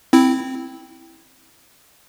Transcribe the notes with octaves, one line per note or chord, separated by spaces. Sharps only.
C4 E4